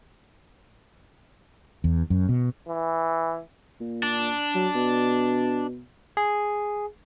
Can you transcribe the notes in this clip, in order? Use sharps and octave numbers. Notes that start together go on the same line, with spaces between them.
E2
F#2
B2
E3
A#2
D4
F#3
B2
G#4